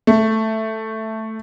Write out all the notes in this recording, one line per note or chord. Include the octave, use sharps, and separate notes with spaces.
A3